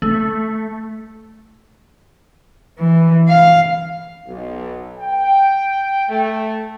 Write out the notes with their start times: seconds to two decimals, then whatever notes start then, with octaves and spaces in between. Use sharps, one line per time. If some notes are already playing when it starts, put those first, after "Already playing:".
0.02 A3
2.79 E3
3.28 F5
4.28 B1
4.99 G5
6.09 A3